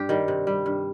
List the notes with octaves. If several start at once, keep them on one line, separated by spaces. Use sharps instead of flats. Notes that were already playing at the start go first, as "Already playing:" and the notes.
Already playing: G2 G4
D#3 G3
C3
G3
G2